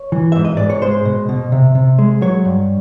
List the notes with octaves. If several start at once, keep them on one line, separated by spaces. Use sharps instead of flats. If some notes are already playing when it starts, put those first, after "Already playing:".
Already playing: C#5
E3
G#2 E5
D#5
G#2 D5
C#5
G#3 C5
B2
B2
C3
C3
G#3
F#3 C#5
G2